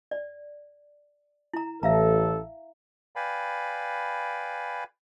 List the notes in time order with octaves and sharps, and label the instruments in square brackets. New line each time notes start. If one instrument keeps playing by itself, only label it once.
[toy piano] D5
E4 A#5
[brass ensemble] A1 A4 [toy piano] E5 F5 A#5
[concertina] B4 D5 F5 G5 G#5 B5